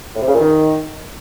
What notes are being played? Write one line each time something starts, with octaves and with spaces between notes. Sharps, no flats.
A2
C3
C#3
A#2
D#3